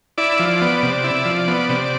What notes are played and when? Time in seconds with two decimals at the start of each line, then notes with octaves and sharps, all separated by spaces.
0.18 E4 D5
0.39 F3
0.61 B3
0.83 C3
1.04 E4
1.25 F3
1.48 B3
1.69 C3